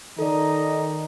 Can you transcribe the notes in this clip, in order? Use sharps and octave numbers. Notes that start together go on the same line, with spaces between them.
D#3 D#4 A4 D5